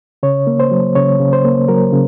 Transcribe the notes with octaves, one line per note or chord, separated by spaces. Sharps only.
C#3 C#5
A#3
C5
F#3
C#3 C#5
C#3
C5
A#3
F#3 A#4
C#3